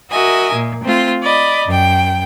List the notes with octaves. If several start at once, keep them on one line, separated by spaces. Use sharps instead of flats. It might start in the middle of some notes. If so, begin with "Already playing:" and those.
F#4 A#4 D#5 E5 G#5
A#2
A3 C4 F4
D5 D#5 B5
F#2 G5